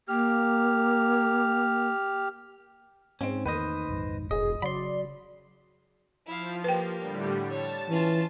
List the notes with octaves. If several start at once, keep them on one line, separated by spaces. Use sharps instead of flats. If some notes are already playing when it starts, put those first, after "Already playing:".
A#3 G4 F6
G#2 C4 C#4
E2 D#3 A3 A#3 B4 C5 D#5
A#1 F2 G#2
E1 G#4 D#5
C#3 F#3 D5 B5 C6
F3 E4 F5
A#3 G4 B4 G5
A2 D3 G3
C#5 A5
E3 C#4 F4